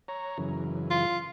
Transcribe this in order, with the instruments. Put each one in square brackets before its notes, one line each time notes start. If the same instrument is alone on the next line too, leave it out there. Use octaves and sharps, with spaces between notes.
[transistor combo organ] C#5 A#5
F#2 C#3 E3
[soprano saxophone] F4